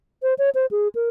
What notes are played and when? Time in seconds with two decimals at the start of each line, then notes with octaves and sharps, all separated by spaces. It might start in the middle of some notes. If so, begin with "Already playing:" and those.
0.23 C5
0.38 C#5
0.55 C5
0.71 G#4
0.95 A#4